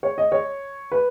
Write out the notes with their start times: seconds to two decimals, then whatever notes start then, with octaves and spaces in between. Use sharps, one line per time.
0.03 C#5
0.18 D#5
0.32 C#5
0.92 B4